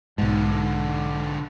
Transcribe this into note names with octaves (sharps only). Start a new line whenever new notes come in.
B1 G#2 D3 F3